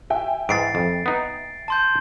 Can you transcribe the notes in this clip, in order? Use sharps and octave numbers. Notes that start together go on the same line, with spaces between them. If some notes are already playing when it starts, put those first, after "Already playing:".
E5 G5 G#5
G#2 E3 A6 C7 D7
F2
B3 D#4
A5 C6 G6